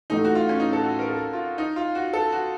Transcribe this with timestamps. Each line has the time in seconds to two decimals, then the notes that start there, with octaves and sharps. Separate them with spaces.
0.10 A1 A2 A3 D#4
0.24 F#4
0.35 F4
0.49 C#4
0.60 D#4
0.73 A4
0.84 F#4
0.99 A#4
1.09 A4
1.33 F4
1.58 D#4
1.76 F4
1.95 F#4
2.13 A4
2.32 F#4